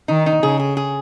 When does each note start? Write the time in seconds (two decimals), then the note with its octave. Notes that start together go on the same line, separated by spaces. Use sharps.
0.08 D#3 D#4
0.26 D#4
0.43 C#3 G#4
0.59 G#4
0.77 G#4